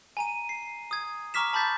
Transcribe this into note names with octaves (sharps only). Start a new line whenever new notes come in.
G#5 A#5 D#7
C7
D#6 G#6
A#5 C#6 D6 F6 B6 E7
A5 B5 D6 G6 A6 B6